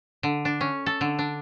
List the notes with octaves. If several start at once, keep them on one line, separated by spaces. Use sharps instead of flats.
D3
D4
C#4
A4
D3
D4